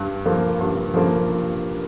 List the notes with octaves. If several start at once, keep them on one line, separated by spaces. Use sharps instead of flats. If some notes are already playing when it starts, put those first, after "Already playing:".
Already playing: G2
F3 A#3
G2
F3 A#3